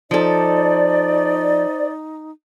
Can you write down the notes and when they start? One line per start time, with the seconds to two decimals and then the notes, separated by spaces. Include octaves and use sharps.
0.11 F3 D#4 A4 C5 D5